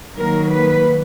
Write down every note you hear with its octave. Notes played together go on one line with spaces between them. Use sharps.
D#3 F#3 A#3 A#4
B4